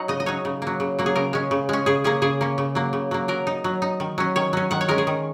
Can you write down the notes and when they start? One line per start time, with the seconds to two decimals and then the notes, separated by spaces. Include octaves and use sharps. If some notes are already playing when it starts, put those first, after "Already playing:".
Already playing: F#3 D#4 F#5
0.08 C#3 D#5
0.20 D#5
0.26 F#3 D#4 C#5
0.45 C#3
0.62 F#3 A#3
0.80 C#3
0.99 F#3 A#3
1.06 G#4
1.16 C#3 A#4
1.33 G#3 C#4
1.51 C#3
1.69 G#3 C#4
1.86 C#3 G#4
2.04 A#3 C#4 G#4
2.22 C#3 G#4
2.41 A#3 C#4
2.58 C#3
2.75 F#3 A#3
2.93 C#3
3.11 F#3 A#3
3.28 F#3 A#4
3.47 D#4
3.64 F#3
3.82 D#4
4.00 D#3
4.18 F#3 C#4
4.36 D#3 C#5
4.53 F#3 C#4
4.71 D#3 F#5
4.81 C#5
4.88 G#3 C#4 A#4
4.98 G#4
5.07 D#3